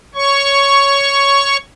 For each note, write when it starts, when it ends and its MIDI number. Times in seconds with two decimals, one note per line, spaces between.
0.15 1.57 73
0.15 1.57 85